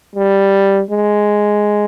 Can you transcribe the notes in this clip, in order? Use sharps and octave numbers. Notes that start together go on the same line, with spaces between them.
G3
G#3